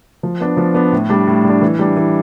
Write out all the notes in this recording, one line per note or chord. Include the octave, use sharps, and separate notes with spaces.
F3
B3 D4
F3
B3 D4
A2
G3 D4
A2
G3 D4
E3
G3 D4
E3